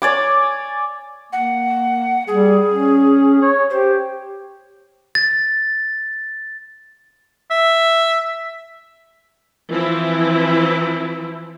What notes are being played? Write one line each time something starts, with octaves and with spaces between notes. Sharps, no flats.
C#5 D5 G#5 D6
A#3 F#5
G3 G#4
C#4
C#5
G4 C5
A6
E5
E3 F3 C4 E4